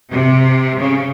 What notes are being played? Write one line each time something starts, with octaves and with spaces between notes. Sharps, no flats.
C3
C#3